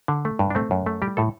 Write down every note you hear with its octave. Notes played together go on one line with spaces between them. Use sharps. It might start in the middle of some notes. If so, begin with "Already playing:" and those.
D3
A3
G2
D4
A3 C4
F#2
A3
G3 G4
A2 A4